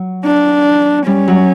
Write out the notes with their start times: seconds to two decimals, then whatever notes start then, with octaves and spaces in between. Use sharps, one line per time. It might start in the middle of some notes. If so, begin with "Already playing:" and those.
Already playing: F#3
0.25 D4
1.07 G3 C#4
1.28 F#3